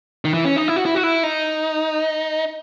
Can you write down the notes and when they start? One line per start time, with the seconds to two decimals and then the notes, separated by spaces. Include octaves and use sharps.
0.25 D#3
0.34 E3
0.45 C#4
0.56 D#4
0.68 E4
0.76 F#4
0.86 E4
0.95 F#4
1.03 E4
1.23 D#4